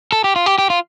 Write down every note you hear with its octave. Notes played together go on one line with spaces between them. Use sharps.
A4
G4
F4
G4
G4
F4